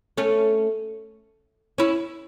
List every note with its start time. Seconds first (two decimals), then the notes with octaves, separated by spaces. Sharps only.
0.17 A3 C#4
1.78 C#4 E4